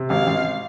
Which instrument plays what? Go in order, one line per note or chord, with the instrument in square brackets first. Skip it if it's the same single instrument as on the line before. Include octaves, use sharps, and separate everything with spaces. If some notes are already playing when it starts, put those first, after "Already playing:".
Already playing: [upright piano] C3
[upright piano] G#1 [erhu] F5
[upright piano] G#1